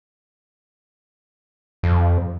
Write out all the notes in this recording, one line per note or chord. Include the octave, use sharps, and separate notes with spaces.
F2